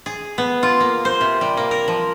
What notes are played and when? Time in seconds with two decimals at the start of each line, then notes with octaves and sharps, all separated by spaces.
0.06 G#4
0.38 B3
0.63 F4
0.80 A#3
1.05 C5
1.21 C3
1.41 G3
1.57 A#3
1.71 A#4
1.88 F3